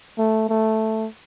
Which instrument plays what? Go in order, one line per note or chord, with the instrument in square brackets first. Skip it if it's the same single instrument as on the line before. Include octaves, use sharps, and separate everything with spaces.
[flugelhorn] A3
A3